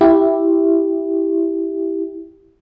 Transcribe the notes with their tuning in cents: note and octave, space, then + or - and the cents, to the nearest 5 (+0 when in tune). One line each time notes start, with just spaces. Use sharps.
E4 +0 G4 +0